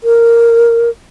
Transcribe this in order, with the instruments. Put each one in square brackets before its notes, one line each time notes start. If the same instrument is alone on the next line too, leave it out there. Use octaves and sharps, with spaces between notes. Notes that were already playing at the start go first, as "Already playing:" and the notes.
[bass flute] A#4